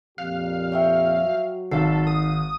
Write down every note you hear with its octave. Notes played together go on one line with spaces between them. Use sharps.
F2 A#2 G4 F5 F#6
C#5 E5 G5
F#3
G#1 D#4 A4 F5 C7
D#6